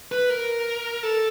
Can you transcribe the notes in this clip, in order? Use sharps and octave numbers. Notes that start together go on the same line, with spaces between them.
B4
A#4
A4